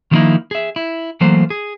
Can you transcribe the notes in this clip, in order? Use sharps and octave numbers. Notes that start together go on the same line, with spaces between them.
D#3 F3 G3 A#3 D#4 E4
G#4 E5
E4
E3 F#3 A3 A#3 C5
G#4